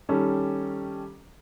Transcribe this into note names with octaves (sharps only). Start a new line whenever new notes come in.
D#3 G3 C#4 G4 A4